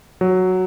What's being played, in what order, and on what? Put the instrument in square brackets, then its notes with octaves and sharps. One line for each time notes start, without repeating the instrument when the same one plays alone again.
[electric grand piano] F#3